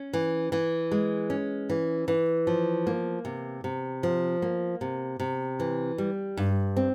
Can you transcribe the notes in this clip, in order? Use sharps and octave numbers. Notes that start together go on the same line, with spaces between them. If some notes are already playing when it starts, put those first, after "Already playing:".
Already playing: C#4
E3
E3
G#3
C#4
E3
E3
F3
A#3
C3
C3
F3
A#3
C3
C3
E3
G3
G2
C4